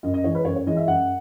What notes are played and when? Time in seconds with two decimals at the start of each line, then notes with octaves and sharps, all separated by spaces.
0.03 F#2 D#5
0.14 D#5
0.24 E3 G#3 C#5
0.35 B4
0.45 F#2 C#5
0.56 C#5
0.66 E3 G#3 D#5
0.77 E5
0.87 F#2 F#5